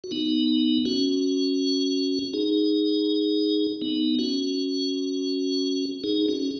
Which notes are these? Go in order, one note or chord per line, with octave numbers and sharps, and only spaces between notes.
F#4
B3 D#4
C#4 F#4
D#4 G#4
B3 D#4
C#4 F#4
D#4 G#4
C#4 F#4